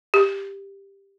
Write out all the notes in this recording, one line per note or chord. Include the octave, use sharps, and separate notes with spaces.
G4